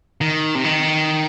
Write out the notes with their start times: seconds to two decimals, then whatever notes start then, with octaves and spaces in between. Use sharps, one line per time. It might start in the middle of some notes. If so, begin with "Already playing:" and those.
0.21 D#3
0.55 C3
0.65 D#3